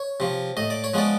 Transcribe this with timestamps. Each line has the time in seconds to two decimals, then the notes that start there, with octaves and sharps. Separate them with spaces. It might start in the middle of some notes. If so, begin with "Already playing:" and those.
Already playing: C#5
0.20 C3 F3
0.57 A2 D#5
0.70 D5
0.84 C#5
0.94 F3 G#3 B3 D5